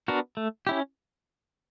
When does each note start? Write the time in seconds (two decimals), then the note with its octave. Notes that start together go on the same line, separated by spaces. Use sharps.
0.08 B3 D4 F#4 A#4
0.37 A3
0.67 C#4 E4 G4